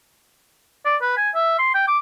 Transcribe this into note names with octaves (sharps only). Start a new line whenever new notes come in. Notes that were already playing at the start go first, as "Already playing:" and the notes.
D5
B4
G#5
E5
C6
G5
D6